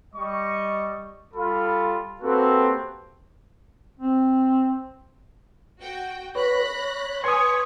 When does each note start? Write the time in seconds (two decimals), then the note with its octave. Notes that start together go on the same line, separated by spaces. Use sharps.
0.15 G3 D#5 C#6
1.34 G3 F4 A4 F5 B5
2.22 A#3 C4 F#4 G4 A4 B4
4.00 C4
5.80 F#4 G5
6.35 B4 C#5 B5 F#6 A#6
6.75 C#5
7.24 B4 C#5 G#5 C6 C#6 D#6